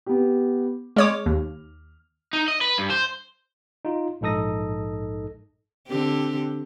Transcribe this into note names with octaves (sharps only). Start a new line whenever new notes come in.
B3 G4
G#3 C#5 D6 F6
D#2
D#4
D#5
B4
G2
C5
D#4 F4
A#1 G#2 D#4 A4 D#6 A#6
D3 C4 G4